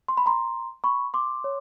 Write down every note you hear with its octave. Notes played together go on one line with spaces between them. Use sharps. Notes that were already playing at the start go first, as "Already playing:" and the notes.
C6
B5
A#5 C6
B5 C#6
C6 D6
C#5